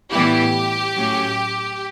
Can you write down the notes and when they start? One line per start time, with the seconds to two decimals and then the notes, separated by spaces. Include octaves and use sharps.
0.11 A2 E3 G3 B3 E4 G4
0.95 A2 F#3 C#4